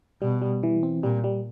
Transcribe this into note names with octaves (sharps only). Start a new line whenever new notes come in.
B2 G3
G3
E3
C4
A#2 G3
G3